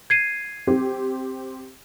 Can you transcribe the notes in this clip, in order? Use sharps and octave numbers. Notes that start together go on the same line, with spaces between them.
G#6 C7 D#7
C4 G4